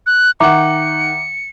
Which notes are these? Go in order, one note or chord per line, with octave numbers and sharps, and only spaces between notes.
F#6
D#3 E5 F#5 A#5 D6 C#7